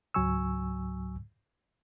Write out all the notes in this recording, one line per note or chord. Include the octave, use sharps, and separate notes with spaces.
C#2 G#2 F#3 G#5 C#6 E6